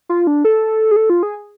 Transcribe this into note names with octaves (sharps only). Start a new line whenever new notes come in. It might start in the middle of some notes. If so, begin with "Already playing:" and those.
F4
D4
A4
G#4
A4
F4
G#4